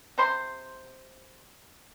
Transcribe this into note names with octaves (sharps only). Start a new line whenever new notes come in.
C3 C5 C6